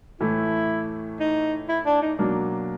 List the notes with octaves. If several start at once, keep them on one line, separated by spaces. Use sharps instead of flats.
A2 E3 A3 E4
D#4
E4
D4
D#4
B2 F#3 A#3 D4